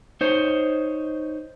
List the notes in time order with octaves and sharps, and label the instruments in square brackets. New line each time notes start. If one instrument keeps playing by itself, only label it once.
[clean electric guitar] D#4 C5 C#5